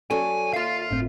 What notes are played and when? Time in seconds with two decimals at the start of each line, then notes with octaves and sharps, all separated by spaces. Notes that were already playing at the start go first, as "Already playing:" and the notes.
0.10 F#3 C#4 A4 D5 G#5
0.53 D#2 F4 E5 F5
0.91 G1 A2 C4